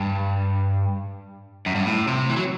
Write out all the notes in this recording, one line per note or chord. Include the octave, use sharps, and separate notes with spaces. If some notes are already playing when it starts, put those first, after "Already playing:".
Already playing: G2
F#2
G2
A2
C3
E3
F#3